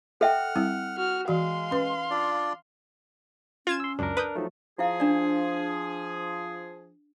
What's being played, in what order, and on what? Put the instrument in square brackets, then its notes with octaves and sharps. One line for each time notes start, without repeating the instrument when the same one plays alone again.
[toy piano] A4 E5 G5 [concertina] F#5 F6
[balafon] G3 C4 E4
[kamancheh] F#4 F6
[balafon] E3 F#4 [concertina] G#3 [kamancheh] F5 C6
[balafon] C#4 B4
[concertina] D4 F4 D5
[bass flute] C#4 [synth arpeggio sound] F4 G#6 E7
[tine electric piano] C6 E6
[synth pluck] C#2 F#2 [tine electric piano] D4 A#4
[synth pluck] B4 D#6 G6
[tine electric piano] F3 F#3 A3 [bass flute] D#4
[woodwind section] F3 G#4 [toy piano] E4 F5
[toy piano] D4 D5